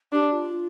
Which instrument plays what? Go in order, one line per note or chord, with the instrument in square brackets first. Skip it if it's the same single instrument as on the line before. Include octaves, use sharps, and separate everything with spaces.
[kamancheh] D4 [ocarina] G4
[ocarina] F4